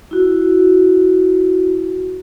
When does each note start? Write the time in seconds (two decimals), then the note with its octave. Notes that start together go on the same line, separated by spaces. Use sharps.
0.11 E4 F#4